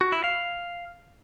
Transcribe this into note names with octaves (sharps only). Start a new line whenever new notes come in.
F#4
E4
F5